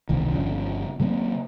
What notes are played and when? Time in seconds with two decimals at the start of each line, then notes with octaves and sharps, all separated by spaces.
0.09 E1 C2 D#3
0.33 G1 C#3 F3
1.00 C#3 F#3 A#3 C4